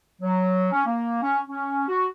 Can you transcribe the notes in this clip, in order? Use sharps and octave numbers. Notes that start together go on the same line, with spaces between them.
F#3
C#4
A#3
C#4
C#4
F#4